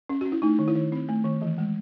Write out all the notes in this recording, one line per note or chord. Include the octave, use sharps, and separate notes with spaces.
C#4
C#4 F#4
E4
A3 D#4
D#3
E4
D#3
C4
A3
D#3
E3
G#3